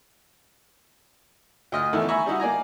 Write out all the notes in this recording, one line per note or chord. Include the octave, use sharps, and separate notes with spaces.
D2 D#5 F6
E2 D#3 A3 E4
E5 G#5 A#5 B5 C#6
G3 D#4 E4 F#4
A#3 D5 G#5 A#5